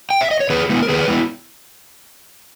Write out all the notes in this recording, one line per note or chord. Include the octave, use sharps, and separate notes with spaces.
G5
E5
D#5
C#5
D#3 G#4 B4
G#3 B3 E4
A#4
D#3 G#4 B4
G#3 B3 E4